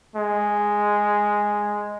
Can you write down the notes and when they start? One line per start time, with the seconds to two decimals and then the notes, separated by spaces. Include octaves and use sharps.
0.16 G#3